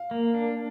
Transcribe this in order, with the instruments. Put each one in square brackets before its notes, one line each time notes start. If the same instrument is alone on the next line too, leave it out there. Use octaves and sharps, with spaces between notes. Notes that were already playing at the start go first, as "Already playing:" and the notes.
Already playing: [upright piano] F5
[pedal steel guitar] A#3
D4